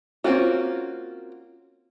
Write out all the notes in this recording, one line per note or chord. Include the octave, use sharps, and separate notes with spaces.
A#3 C4 C#4 F4 F#4